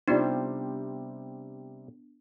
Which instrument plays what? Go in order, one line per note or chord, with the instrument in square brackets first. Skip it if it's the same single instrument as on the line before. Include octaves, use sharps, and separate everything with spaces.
[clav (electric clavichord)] C3 G3 C5 [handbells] B3 D4 [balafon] D#4 F4 D5